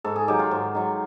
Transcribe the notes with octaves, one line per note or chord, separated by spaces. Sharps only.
G#2 A4
G#4
D#3 F#3 G4
F4
G#2
D#3 F#3